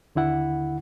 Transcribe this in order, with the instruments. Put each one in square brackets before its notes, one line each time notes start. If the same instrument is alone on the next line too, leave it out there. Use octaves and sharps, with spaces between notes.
[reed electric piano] D#2 D3 E4 F#5